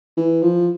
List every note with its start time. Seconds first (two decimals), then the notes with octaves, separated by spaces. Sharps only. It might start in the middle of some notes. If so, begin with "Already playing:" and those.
0.17 E3
0.43 F3